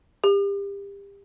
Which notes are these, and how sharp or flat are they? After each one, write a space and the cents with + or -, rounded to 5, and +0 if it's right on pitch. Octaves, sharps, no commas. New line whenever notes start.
G4 +30